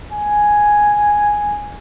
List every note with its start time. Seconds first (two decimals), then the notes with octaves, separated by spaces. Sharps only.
0.12 G#5